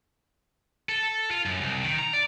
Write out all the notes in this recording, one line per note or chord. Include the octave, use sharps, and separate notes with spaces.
A4
F4
F#2
C2
D#3
A#5
D5